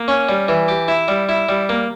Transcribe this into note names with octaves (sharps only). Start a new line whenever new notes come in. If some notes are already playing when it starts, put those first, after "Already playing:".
Already playing: A#3
C#4
G3
E3
G4
E4
G3
E4
G3
A#3